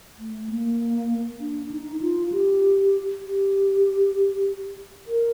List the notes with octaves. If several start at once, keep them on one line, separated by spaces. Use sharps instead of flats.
A3
A#3
D4
D#4
F4
G4
G4
A#4